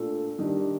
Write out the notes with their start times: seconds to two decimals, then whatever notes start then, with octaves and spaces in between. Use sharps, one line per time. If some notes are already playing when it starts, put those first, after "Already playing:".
Already playing: A#2 A3 D4 F4 A4
0.39 D#3 G3 D4